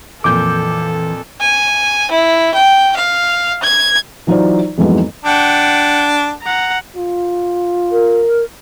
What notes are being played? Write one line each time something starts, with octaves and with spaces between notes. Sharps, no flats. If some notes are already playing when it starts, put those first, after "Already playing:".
F2 A#2 E3 A4 D6 G6
G#5
E4
G5
F5
G#6
E3 F#3 D#4 F4 C5 D5
F2 G#2 E3 F#3 G#3 B3
D4 F#5 G5
F#5 A#5
F4
A#4